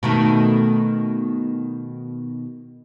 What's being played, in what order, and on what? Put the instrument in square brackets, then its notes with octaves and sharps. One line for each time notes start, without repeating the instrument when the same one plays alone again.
[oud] B2 D#3 A3